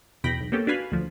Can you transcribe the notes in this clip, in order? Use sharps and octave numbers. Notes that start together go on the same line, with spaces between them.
E2 B2 G5 B5 A#6
B1
A#3 B3 C#4 G4 A4
D4 F#4 B4 F5 G#5 B5
D2 F3